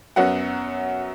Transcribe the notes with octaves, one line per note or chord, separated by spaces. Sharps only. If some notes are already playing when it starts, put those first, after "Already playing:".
F#2 F#3 B3 F#5